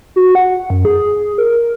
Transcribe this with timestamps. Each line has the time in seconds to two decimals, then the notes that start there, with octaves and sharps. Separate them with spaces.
0.16 F#4
0.35 F#5
0.70 F#2
0.85 G#4
1.38 A#4